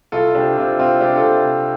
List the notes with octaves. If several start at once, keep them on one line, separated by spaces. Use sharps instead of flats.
C2 F4 A4
C3 D4 G4
C3 C4 F4
C3 C4 F4
C3 D4 G4
F4 A4
C3
C3